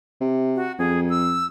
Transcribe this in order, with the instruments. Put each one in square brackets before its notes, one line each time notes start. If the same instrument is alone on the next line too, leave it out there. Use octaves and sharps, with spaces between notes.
[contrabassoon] C3
[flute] F#4
[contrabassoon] F2 [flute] G#4
[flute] E6